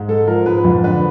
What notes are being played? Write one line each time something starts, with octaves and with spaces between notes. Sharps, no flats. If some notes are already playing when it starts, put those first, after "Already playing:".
Already playing: G#2
G#3 A4
F3 A#4
G#2 B4
F2
D3 B4